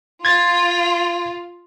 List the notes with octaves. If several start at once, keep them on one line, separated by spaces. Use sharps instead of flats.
F4 G#6 A6